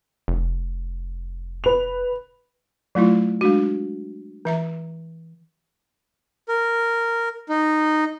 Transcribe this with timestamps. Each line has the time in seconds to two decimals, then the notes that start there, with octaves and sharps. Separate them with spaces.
0.28 F1
1.64 B4 F7
2.95 F#3 A3 E4 F4
3.41 G#3 D4 F#4
4.45 E3 E5 A#5
6.48 A#4
7.49 D#4